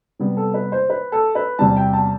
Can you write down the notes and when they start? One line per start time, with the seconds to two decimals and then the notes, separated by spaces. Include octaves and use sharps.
0.19 C3 G3 B3
0.37 A4
0.54 B4
0.72 C5
0.90 B4
1.12 A4
1.35 B4
1.59 E2 C3 G3 A5
1.76 G5
1.93 A5